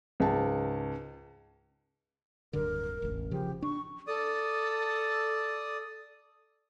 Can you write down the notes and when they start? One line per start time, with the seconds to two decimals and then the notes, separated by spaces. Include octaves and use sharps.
0.20 C#2 G#2 A5
2.53 D1 G2 D3 A#4
3.02 E1 A1
3.31 C#3 F3 G4
3.62 D4 C#6
4.07 A4 D5 D#6